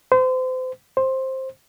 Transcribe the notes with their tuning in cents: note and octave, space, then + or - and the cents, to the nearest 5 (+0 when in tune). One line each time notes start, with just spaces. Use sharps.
C5 -35
C5 +10